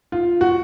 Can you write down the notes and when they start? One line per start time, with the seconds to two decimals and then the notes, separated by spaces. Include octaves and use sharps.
0.12 F4
0.41 F#4